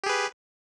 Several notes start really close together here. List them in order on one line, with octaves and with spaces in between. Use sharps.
G4 G#4 B4